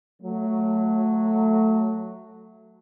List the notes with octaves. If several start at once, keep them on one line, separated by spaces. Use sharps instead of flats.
F#3 A3